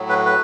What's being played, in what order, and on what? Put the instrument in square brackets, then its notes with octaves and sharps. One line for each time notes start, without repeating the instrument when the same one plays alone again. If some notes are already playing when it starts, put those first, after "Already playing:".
Already playing: [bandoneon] A2 F#3
B4
B4